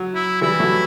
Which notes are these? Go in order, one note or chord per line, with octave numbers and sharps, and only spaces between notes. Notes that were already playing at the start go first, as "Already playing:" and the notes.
Already playing: F#3
E4
E3 G3 E4
F#3 A3